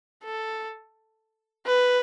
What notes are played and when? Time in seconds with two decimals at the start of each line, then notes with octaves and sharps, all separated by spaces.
0.24 A4
1.66 B4